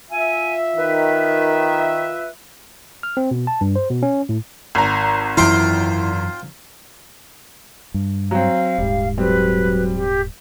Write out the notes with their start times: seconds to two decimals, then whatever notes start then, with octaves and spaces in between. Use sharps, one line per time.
0.11 F4 E5 G#5
0.76 D#3 B4
3.03 F6
3.17 C4
3.31 B2
3.47 A5
3.61 G2
3.76 C5
3.90 B2
4.03 C#4
4.29 A2
4.75 G#1 A#5
5.37 F#2 E3 E4 F4 C5 G5
7.94 G2
8.31 F#3 C4 F5
8.78 D#1 G#2 G3
9.18 F#3 G3 C4 B4
9.94 G4